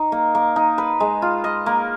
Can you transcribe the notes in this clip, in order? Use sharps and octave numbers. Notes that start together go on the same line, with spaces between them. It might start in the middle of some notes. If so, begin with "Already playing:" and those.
Already playing: D#4
A#3
A#3
D#4
B4
G#3
F4
D#5
A#3